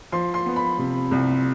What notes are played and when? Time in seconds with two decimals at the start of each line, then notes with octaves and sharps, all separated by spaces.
0.12 F3 C6
0.34 C6
0.46 B3
0.56 B5
0.78 C3
1.11 C2